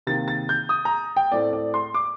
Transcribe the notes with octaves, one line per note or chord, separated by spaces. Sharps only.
C3 D#3 A#3 A6
A6
G6
D#6
A#5
G5
A2 A3 C4 D5
D5
C6
D6